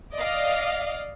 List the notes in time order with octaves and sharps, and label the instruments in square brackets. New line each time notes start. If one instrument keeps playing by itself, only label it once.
[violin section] D5 D#5 F5